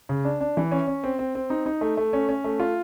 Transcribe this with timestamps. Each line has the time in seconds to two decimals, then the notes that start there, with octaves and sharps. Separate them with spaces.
0.09 C#3
0.25 D4
0.41 D4
0.57 E3
0.71 C#4
0.87 C#4
1.04 C4
1.19 C4
1.35 C4
1.50 D#4
1.66 D#4
1.81 A3
1.97 A3
2.13 C#4
2.29 C#4
2.44 A3
2.60 F4